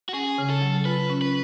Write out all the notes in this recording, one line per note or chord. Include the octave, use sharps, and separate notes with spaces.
F#4
C#4 G#4
C#3
A4
F#3
F4 B4
C#4
B4